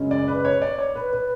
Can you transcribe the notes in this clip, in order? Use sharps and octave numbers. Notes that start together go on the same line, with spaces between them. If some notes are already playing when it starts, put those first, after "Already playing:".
Already playing: F#2 C#3 G#3 C#4
D5
B4
C#5
D5
C#5
B4
B4